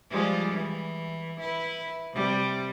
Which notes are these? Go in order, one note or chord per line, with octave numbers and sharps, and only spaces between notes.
F3 G3 G#3
E3
E4 B4
C3 G3